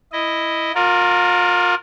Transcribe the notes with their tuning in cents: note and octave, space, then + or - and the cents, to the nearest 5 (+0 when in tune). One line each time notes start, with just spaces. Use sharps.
E4 +0 D#5 +0
F4 +35 A#4 -10 D5 +0